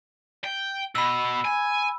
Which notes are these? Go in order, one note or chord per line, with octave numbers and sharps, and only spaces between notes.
G5
B2 B5 E6
G#5